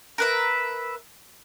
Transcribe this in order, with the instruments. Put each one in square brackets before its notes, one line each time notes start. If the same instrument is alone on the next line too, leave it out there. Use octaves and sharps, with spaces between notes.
[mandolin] A#4 B4 E5